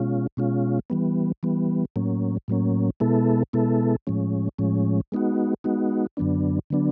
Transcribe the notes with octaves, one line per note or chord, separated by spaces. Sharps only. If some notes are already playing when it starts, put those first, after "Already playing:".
Already playing: B2 G#3 C#4 F4
B2 G#3 C#4 F4
E3 G3 B3
E3 G3 B3
A2 F#3 A#3 C#4
A2 F#3 A#3 C#4
B2 G#3 B3 E4 A4
B2 G#3 B3 E4 A4
A2 F3 G#3 C#4
A2 F3 G#3 C#4
G#3 B3 D#4 F#4
G#3 B3 D#4 F#4
F#2 D3 F#3 B3 D4
D3 F#3 B3 D4